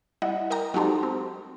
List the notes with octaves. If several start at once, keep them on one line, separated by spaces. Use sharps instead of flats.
G3 E4 D#5 F#5
A#4 D#5 G5 A#5
F#3 G#3 D#4 G4 A4 C5
C4